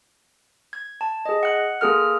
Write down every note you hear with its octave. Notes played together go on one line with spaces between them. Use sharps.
G#6
A5
G#4 D#5
F#5 F#6
A#3 G#4 A4 F6